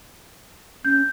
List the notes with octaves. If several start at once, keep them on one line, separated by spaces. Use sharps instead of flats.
C#4 G6